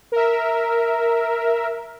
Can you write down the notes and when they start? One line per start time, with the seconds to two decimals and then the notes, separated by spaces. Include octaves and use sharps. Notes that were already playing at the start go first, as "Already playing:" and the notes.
0.12 A#4 E5